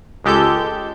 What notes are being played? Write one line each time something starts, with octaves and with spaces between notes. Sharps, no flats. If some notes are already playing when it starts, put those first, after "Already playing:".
C#2 G#3 G4 A4 G6